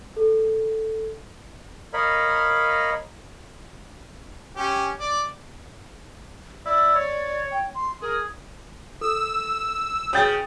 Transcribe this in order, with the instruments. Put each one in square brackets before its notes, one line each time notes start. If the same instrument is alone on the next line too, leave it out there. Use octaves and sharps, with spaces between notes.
[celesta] A4
[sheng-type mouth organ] A#4 C#5 D#5 F5 B5
[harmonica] C#4 G4
D5
[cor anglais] E4 [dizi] D5
[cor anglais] C#5
[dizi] G5
C6
[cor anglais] G#4 [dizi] A#4
[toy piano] A4 [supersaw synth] E6
[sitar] C#3 [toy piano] C#5 G5 [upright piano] D#6 G6 A6